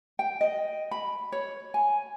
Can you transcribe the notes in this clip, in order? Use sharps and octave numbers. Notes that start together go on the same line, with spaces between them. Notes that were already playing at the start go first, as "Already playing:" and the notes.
G5
D#5
B5
C#5
G#5